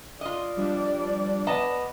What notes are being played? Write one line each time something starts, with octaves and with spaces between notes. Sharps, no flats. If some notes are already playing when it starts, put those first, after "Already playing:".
F4 D5 D#5
F3 G3 D4
B3 D#5 A5